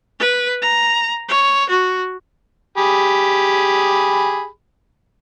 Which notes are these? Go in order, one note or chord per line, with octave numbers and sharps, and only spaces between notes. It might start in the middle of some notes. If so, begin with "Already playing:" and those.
B4
A#5
C#5
F#4
G4 G#4 B5